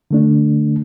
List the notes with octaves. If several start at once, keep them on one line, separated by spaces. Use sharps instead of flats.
D3 A3 D4